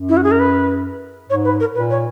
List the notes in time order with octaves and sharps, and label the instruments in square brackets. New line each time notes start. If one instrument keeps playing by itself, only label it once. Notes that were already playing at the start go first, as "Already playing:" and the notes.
Already playing: [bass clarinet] F#2
[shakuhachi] E4
F#4
G#4
A#4
B4
[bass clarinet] G#2 [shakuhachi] C#5
[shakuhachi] B4
A#4
[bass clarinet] A#2 [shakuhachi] B4
[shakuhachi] C#5